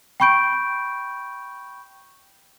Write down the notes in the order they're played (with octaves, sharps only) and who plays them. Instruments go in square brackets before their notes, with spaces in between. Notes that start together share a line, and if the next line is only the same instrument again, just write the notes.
[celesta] G5 B5 C#6 G6 D7